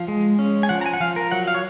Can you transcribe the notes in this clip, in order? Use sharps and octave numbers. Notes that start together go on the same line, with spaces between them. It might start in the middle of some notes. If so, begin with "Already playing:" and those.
Already playing: F3 F5
G#3
C#4
G#5
F3 F#5
A#5
G#5
F#5
F3 F5
A#4
F#3 F#5
F5
C#5